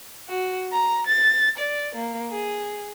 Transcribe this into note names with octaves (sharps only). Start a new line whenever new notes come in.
F#4
A#5
A6
D5
A#3
G#4